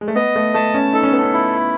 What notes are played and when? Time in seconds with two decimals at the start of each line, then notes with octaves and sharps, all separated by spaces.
0.01 G#3
0.08 A3
0.15 B3 D#5
0.36 A3
0.54 A3 A5
0.74 C#4
0.93 D#4 A4
1.03 C#4
1.12 B3
1.21 C#4
1.33 E4